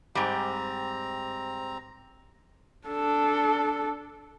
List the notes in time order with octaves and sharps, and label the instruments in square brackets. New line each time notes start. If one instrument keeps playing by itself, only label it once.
[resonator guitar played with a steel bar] G#2 G3 [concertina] C4 A#5
[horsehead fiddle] D4 A4